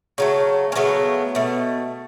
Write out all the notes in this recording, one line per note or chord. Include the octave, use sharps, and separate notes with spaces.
C#3 F#3 A3
C#4
C#3 F#3 A3 B3
B2 A3